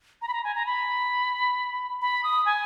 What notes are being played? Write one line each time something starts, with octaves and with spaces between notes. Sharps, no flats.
A#5
B5
A#5
G#5
A#5
B5
B5
D#6
G#5